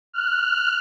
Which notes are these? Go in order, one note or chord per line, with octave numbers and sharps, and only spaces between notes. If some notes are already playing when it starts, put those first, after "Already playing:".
F6 F#6